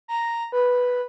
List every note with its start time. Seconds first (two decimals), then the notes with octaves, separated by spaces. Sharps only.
0.08 A#5
0.52 B4